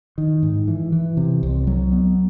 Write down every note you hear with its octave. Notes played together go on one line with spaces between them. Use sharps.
D#3
G#2
E3
E3
C3
C2
F#3
B3